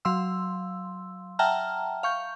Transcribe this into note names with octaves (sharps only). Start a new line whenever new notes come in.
F#3 F5 C6 E6
E5 F#5 G5 A5 A#5 F6
F5 C#6 G6